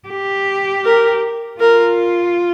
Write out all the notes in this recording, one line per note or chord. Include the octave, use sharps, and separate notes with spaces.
G4
A#4
F4 A#4